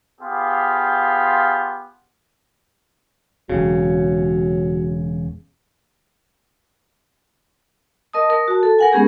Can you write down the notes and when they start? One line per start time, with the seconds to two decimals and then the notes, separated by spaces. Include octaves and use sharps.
0.21 B3 F4 G4 G#4 F5
3.50 E1 C#3 F#3
8.13 A#4 D#5 A5 D#6
8.30 A#4 D#6
8.48 F#4 A5
8.63 A4
8.79 A#4 F#5 G#5
8.92 G#3 B3 C#4 G4 G#4 A#4